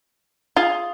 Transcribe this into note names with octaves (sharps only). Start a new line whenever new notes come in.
F4 G#4